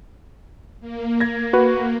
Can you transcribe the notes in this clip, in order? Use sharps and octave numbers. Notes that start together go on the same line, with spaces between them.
A#3
G#6 A#6
F#4 B4